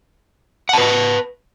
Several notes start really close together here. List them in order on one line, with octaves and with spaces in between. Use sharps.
F#5 A5 B4